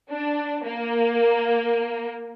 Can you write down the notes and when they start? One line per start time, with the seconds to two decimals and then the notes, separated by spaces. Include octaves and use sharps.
0.11 D4
0.65 A#3